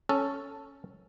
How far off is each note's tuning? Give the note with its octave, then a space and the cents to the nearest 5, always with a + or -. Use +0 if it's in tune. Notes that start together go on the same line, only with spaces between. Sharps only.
C#4 +0 A4 +0